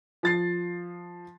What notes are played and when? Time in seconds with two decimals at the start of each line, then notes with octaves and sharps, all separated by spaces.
0.23 F3 A6 C7